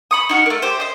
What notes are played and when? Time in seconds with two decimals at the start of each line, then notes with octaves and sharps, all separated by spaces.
0.11 B5 C#6 D#6
0.29 D#4 F#4 F6
0.46 A3 A#3
0.62 G4 C5
0.80 C5 D#5